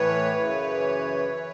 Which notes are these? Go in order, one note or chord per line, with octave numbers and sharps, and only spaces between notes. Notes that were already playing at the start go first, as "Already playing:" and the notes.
Already playing: A2 E3 B4 C#5
F#2 C#3 E3
E3